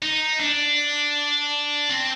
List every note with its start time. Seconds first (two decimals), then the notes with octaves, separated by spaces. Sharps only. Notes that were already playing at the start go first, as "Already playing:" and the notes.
0.03 D#4
0.40 D4
1.89 C4